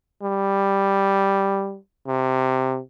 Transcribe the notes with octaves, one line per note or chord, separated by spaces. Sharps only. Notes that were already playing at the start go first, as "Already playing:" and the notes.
G3
C3